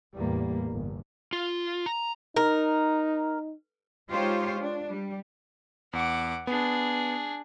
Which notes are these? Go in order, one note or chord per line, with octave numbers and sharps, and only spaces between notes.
E2 A2 G3 A#3
G1
F4
A#5
D#4 A#4
G#3 D#4 F4 G4 C5 C#5
D4
G3
E2 F#5 D6
B3 D4 G#4